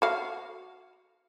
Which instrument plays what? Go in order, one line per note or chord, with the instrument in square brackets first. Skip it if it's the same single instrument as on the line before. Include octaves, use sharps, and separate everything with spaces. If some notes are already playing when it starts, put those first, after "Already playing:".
[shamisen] F#4 F5